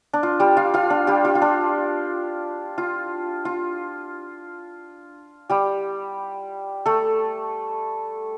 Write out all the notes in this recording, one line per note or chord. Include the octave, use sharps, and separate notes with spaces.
D4
F4
G3 G4
F4 F5
F4 F5
D4
G3 G4
F4
F4
D4
F4
F4
G3 G4
A3 A4